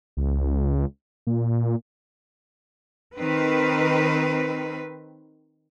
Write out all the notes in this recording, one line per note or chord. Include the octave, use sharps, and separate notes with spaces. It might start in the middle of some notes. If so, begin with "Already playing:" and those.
C#2
A#2
D#3 C4 B4